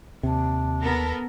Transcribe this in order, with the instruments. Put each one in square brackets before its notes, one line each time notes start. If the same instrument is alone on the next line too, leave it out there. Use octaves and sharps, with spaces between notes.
[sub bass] D#2 [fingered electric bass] C3 [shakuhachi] D4
[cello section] B3 A4 A#4